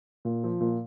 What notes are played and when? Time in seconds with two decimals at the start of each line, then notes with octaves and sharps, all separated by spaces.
0.25 A#2
0.44 F3
0.61 A#2